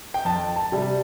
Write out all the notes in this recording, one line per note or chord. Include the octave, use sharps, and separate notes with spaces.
G5
F2 A5
A5
C3 G3